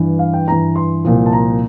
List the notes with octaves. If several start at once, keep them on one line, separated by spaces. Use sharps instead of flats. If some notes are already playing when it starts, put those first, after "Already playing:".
Already playing: G2 E3
F5
G5
G2 E3 A#5
C6
C2 A#2 F3
A5
A#5